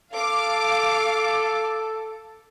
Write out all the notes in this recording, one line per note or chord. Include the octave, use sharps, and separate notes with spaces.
A4 F5 D6